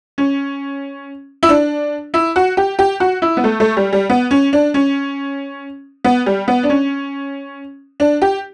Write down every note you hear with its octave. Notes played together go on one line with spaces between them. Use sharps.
C#4
E4
D4
E4
F#4
G4
G4
F#4
E4
B3
A3
A3
G3
G3
B3
C#4
D4
C#4
B3
G3
B3
D4
C#4
D4
G4